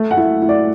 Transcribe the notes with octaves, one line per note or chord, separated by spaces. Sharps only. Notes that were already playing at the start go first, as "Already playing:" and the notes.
Already playing: A3
F#5
E4
E4
D5